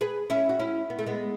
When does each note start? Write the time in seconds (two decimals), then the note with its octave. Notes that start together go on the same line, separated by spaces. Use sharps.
0.01 G#4 B4
0.30 C#4 E4
0.49 F#4
0.59 C#4 E4
0.90 B3
0.99 A3
1.06 G#3 B3